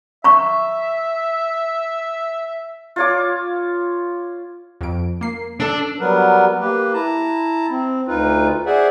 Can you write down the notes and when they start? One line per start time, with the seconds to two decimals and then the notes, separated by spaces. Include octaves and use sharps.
0.24 E5 A#5 C#6
2.96 F4 C#5 D6
4.81 F2 D7
5.21 A#3 C7
5.60 D4 A4 E6
5.98 F#3 G3 B3 A#4 B4
6.60 A#3 G4 B4
6.94 E4 A5 A#5
7.70 C4
8.08 D2 D#4 F4 B4
8.66 G#4 C5 D5 E5 F#5